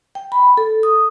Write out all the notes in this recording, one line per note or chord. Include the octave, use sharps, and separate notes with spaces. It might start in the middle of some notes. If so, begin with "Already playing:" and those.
G5
B5
A4
D#6